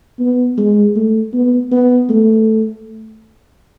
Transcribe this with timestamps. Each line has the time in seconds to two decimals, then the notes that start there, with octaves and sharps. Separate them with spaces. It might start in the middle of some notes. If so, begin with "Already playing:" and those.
0.19 B3
0.58 G#3
0.96 A3
1.33 B3
1.72 B3
2.10 A3